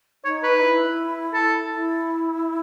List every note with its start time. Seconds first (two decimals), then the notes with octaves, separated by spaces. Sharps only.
0.24 D#4 C#5
0.43 B4
0.55 D#4
0.61 E4
1.33 A4
1.70 E4